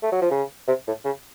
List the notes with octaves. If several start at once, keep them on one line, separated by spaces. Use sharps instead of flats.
A3
F#3
F3
C#3
C3
A2
C#3